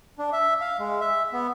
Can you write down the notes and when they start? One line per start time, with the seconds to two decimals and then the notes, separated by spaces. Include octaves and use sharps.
0.18 D4
0.33 E5
0.61 F5
0.79 G#3
1.01 E5
1.33 B3